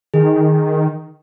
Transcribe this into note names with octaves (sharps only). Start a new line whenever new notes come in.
D#3 G#4